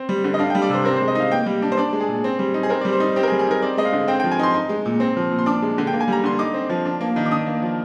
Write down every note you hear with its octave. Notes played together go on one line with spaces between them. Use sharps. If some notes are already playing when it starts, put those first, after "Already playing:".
Already playing: C4
G3
D3
D#5
D4 F5
G5
G3
D5
C3 C5
C4 A#4
C5
G#3
D#5
D#4 F5
A#3 G5
G3
D4
C5
D4 D5
G#3
G#4
A#2
C4
G3
D#4
G#4
C4 A#4
D5
G3
C5
D#4
C4 G4
A#4
G#4
G3
G#4
D#4 A#4
C4 D5
G#3 D#5
F5
D3
C4 G5
G5
F3
G#5
D#4 C6
D#4
G#3
A#2
C4
F3
A#2
C6
D4 D6
G#3
D3
G5
A#3
G#5
G3 A#5
D3 C6
D#4 D6
C4
F3
D4
A#3
D#3
D6
D4 D#6
A#3
F3